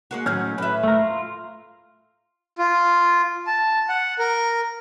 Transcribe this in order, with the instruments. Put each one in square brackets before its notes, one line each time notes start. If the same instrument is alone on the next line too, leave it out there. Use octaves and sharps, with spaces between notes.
[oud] G#3 A#3 F#4
[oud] A2 D#3 F#3 [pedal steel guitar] C#4 F6 G6
[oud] A2 E5 [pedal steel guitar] B4
[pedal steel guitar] A3 A#4
F4
[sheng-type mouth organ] F4
A5
F#5
A#4